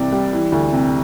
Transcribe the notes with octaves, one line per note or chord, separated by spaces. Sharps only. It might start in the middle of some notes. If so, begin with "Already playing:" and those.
Already playing: C2 C3 E3 D5
G3
E3
D2
C3